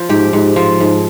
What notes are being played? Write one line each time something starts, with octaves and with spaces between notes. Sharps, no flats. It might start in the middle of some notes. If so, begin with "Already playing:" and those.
Already playing: F3
G#2 G4
G#2
F3
G#2